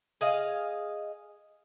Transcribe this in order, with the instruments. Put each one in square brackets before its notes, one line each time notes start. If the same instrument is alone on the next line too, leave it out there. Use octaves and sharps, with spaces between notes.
[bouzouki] G#4 D#5 F5